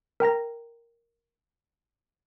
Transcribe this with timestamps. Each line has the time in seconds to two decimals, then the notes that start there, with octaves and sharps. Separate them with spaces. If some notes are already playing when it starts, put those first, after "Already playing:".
0.20 A#4 G5 A#5 A#6